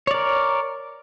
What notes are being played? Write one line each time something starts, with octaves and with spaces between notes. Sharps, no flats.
A#4 C#5 D5